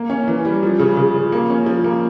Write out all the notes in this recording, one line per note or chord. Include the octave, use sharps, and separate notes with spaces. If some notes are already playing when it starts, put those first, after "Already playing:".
Already playing: A#3
C#4
E3
G3
F3
C#3
C#3
F3
A#3
C#4
F3
A#3